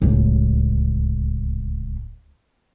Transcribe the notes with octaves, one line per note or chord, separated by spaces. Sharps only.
D1 C#2